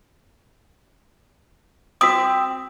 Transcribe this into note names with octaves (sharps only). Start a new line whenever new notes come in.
C4 F#4 D#6